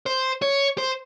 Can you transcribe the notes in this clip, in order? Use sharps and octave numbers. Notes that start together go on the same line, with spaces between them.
C5
C#5
C5